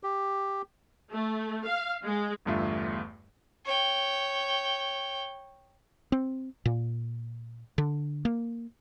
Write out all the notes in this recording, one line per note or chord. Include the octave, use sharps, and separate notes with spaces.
G4
A3
F5
G#3
G1 E2 G2 A3 F4 E5
C#5 G5
C4
A#2
D3
A#3